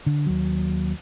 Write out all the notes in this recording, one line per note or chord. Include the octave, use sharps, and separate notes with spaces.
D3
D#2 F#3